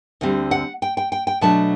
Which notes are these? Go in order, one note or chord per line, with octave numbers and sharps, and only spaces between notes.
D2 D3 G3 C4
F#5
G5
G5
G5
G5
B2 F#3 A3 D4 A5